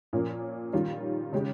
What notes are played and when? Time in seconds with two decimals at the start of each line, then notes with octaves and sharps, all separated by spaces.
0.13 A#2 F3 A#3 C#4
0.73 D#3 G3 C#4 F4
1.33 C#3 G#3 C#4 G4